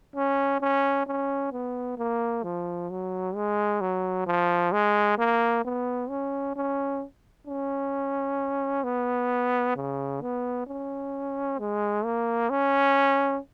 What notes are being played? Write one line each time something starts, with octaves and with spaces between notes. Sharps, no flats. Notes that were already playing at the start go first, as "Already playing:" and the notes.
C#4
C#4
C#4
B3
A#3
F3
F#3
G#3
F#3
F3
G#3
A#3
B3
C#4
C#4
C#4
B3
C#3
B3
C#4
G#3
A#3
C#4